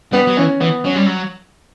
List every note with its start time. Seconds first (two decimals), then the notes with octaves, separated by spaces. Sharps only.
0.12 G3 B3
0.27 F#3
0.37 E3 C#4
0.60 E3 B3
0.85 F#3 C#4
0.95 G3
1.07 F#3